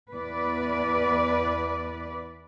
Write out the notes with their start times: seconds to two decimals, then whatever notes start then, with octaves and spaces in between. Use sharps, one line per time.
0.13 E2 B4 D5